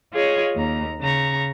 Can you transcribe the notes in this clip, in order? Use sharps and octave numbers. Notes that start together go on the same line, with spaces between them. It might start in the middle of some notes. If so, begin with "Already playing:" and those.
F4 G#4 C#5 D#5
D#2 A#5
C#3 A#5 C#6